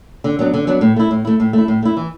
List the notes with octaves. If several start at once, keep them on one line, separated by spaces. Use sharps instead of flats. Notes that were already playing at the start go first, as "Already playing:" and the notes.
D3
F#3 B3 D4
D3
F#3 B3 D4
A2
A3 E4
A2
A3 E4
A2
A3 E4
A2
A3 E4
E3